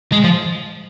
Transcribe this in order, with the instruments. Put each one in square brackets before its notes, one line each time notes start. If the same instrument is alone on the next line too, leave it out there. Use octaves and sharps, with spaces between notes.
[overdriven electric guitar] G#3
F3